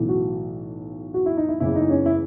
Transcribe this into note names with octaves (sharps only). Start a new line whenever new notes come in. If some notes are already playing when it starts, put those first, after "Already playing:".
Already playing: B1 A2 E3
F#4
F#4
E4
D#4
E4
F#1 E2 C#3 E3 E4
D#4
C#4
E4